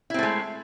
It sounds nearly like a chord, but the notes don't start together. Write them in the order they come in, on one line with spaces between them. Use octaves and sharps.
E4 C4 A3 G#3